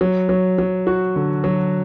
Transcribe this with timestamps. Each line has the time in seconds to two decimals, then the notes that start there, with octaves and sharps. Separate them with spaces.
0.01 F#3
0.29 F#3
0.58 F#3
0.87 F#4
1.16 D3
1.44 F#3